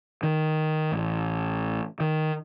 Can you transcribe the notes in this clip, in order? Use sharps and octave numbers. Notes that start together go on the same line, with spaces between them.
D#3
A1
D#3